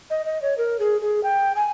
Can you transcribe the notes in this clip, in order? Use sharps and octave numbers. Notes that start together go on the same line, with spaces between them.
D#5
D#5
C#5
A#4
G#4
G#4
G5
G#5